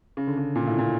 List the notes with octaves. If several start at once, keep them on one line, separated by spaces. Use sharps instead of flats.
C#3
D3
C#3
A#2
A2
A#2